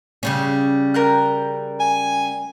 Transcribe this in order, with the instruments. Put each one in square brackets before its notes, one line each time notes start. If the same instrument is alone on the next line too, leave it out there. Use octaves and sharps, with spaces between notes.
[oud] C#3 G3 C#4
[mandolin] A#4 G5 F#6
[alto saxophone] G#5